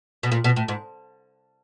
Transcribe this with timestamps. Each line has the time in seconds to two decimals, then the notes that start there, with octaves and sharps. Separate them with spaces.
0.23 B2
0.32 A#2
0.44 B2
0.56 A2
0.68 G#2